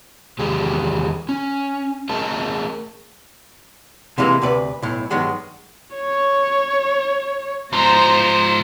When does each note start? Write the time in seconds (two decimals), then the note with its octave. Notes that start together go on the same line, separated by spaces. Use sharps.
0.39 E2 D#3 G#3 G4 G#4
1.29 C#4
2.09 A3 G#4 A#4 D#5 A5
4.18 C3 E3 G#3 A#3
4.42 D2 C3 B4 D5
4.82 B1 A2
5.10 G2 D#3 F#3 G#3 B3
5.95 C#5
7.73 G#2 F3 C5 A#5